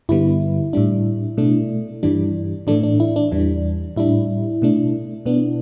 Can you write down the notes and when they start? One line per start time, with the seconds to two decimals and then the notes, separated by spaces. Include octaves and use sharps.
0.09 G2 D3 G3 B3 E4
0.73 A2 G3 D4
1.37 B2 A3 D4
2.03 G2 E3 G3 D4
2.67 A2 E3 A3 D4
2.83 D4
3.00 E4
3.16 D4
3.32 E2 E3 G3 D4
3.96 A2 G3 D4 E4
4.62 B2 A3 D4
5.26 B2 B3 D4